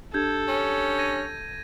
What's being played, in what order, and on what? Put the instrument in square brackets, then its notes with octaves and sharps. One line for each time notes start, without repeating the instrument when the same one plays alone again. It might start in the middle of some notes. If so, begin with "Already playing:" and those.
[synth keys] D4 G4 [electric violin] A4 [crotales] G6 G#6
[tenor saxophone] C#4
[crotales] G#6 A#6 D#7